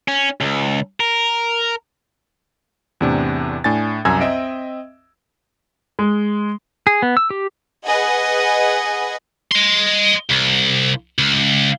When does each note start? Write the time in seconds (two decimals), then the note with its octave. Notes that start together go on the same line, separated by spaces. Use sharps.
0.08 C#4
0.40 C#2
1.00 A#4
3.01 E2 A2 C3 D4
3.64 A2 D4 G#5 A6
4.05 C2 F#2 G#5 A#5 E6 G#6
4.21 C4 D#5 E5 D7
5.99 G#3
6.87 G#4
7.02 B3
7.17 E6
7.30 G4
7.84 G#4 B4 D#5 F#5 G#5
9.51 D#5 C6
10.31 C2
11.19 C#2